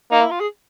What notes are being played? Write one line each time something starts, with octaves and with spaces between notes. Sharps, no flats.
A#3 D#4
E4
F4
G#4